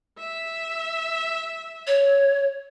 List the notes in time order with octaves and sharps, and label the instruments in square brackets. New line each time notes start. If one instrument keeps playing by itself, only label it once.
[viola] E5
[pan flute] C#5